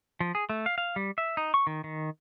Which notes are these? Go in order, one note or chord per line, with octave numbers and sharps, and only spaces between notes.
F3
G#4
A3
F5
F5
G3
E5
D#4
C#6
D#3
D#3